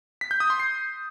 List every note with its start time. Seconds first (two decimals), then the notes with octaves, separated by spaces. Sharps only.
0.21 B6
0.31 G6
0.40 D#6
0.50 C6
0.60 C7